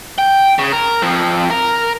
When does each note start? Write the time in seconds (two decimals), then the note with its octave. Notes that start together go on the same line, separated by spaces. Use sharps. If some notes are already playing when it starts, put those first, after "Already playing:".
0.18 G5
0.59 C#3
0.72 A#4
1.02 F2 F3
1.51 A#4